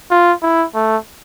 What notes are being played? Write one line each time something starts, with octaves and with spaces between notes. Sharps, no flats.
F4
E4
A3